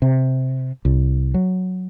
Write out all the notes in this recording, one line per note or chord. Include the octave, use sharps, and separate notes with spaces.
C3
C2
F#3